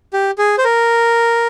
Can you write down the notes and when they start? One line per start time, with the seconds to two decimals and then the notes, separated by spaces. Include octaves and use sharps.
0.13 G4
0.38 G#4
0.58 C5
0.64 A#4